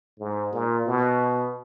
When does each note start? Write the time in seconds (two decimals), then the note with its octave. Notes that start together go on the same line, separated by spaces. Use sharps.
0.19 G#2
0.53 A#2
0.87 B2